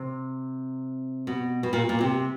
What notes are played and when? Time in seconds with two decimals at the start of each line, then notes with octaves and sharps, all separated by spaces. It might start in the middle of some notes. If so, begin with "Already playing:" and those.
Already playing: C3
1.27 B2
1.63 B2
1.73 A#2
1.89 A#2
2.01 C3